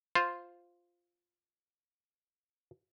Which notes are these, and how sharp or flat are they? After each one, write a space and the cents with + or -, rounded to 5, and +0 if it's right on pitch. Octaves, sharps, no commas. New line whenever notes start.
F4 +0 C5 +0